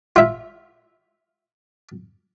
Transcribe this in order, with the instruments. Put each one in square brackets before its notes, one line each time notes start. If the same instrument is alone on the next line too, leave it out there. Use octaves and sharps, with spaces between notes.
[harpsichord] F4 E5